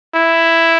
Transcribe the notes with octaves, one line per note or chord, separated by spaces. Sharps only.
E4